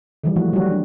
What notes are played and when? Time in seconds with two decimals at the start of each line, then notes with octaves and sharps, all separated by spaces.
0.24 D#3 E3 G3
0.36 F3 A3 A#3 E4 F#4
0.53 F#3 G3 A3 F#4 C#5
0.71 D4